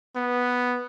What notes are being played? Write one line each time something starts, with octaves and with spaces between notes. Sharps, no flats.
B3